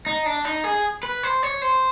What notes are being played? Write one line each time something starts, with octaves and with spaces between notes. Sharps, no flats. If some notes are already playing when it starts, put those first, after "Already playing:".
D#4
D4
D#4
G#4
B4
C5
C#5
C5